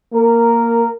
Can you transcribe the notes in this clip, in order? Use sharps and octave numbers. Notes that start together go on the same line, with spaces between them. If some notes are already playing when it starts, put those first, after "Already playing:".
A#3 A#4